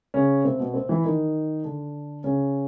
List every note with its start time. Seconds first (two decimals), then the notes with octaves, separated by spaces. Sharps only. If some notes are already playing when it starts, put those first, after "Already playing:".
0.14 C#3 C#4
0.44 C3 C4
0.59 B2 B3
0.74 C3 C4
0.89 E3 E4
1.05 D#3 D#4
1.64 D3 D4
2.24 C#3 C#4